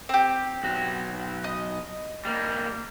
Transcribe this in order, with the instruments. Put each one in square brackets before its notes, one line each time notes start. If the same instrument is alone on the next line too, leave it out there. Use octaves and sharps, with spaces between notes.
[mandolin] C4 G4
[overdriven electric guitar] B1 F#4
[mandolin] D#5
[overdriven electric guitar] G3 A#3